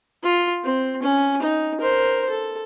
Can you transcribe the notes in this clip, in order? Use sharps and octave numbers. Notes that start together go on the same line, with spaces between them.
F4
C4
C#4
D#4
A#4 C5
A4